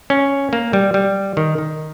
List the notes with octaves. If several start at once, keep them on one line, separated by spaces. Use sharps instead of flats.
C#4
A#3
G3
G3
D#3
D#3